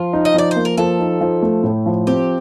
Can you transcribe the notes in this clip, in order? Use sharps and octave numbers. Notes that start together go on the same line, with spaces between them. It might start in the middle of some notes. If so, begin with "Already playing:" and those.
Already playing: F3 F4
D#4
D#5
F3 D5
A#3 C5
A#4
F3 A4
D#4
F3
A3
A2
F3
C4 G4